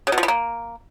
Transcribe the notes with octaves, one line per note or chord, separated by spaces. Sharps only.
C#3
B2
F3
E3
A#3